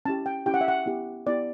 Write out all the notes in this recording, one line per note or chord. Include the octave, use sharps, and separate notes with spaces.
C#4 E4 G4 A5
G5
C#4 E4 G4 G5
F#5
E5
F#5
B3 E4 G4
B3 E4 G4 D5